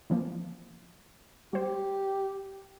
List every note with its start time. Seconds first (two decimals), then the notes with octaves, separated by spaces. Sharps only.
0.10 E3 F3 A#3
1.53 G3 G4 C5